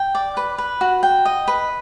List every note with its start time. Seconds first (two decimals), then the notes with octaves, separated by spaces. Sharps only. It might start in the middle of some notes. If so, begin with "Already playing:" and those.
Already playing: G5
0.15 D5
0.37 B4
0.58 B4
0.81 F#4
1.03 G5
1.25 D#5
1.48 B4